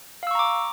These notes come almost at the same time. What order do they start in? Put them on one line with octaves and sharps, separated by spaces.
F5 E6 C#6 A#5 D6